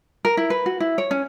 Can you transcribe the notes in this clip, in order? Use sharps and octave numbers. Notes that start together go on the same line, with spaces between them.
A#4
E4
B4
F#4
E4
C#5
C#4